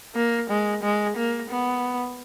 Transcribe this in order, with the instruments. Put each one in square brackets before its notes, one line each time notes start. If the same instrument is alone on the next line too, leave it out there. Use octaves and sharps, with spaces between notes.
[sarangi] A#3
G#3
G#3
A#3
B3